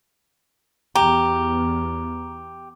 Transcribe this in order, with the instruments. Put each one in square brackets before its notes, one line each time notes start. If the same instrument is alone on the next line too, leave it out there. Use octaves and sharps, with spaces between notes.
[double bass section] E2 [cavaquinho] G4 [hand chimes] A#5